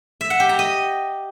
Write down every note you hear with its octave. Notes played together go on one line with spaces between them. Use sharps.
E5
F#5
G4
A#5
D#5